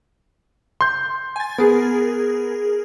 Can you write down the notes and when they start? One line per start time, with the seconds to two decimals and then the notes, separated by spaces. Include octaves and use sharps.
0.81 C6 G6
1.36 G#5 A6
1.58 B3 G#4 A#4